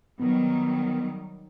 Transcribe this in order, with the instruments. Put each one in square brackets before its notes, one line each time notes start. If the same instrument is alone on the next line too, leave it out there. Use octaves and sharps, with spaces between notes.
[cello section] D#3 F#3 G3 [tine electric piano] B3